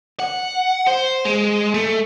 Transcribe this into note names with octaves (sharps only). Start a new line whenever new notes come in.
F#5
C5
G#3
A3